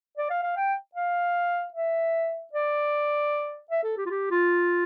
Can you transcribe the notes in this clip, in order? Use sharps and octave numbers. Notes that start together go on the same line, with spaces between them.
D5
F5
F5
G5
F5
E5
D5
E5
A4
G4
F4
G4
F4